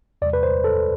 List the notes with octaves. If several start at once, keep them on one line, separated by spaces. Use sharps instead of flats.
E2 C3 G3 D5
B4
C5
A4